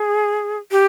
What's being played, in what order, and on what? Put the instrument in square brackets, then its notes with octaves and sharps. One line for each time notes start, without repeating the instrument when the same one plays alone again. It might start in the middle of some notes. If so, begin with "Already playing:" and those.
Already playing: [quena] G#4
G4